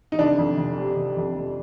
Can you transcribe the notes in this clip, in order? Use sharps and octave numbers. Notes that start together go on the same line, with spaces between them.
D#4
F1 D4
F2
F1
C3
F1
F2
F1